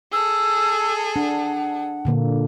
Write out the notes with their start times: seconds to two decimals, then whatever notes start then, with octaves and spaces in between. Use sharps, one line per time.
0.13 G#4 A4 E6
1.16 D4 F#5
2.05 A#2 D3 A#3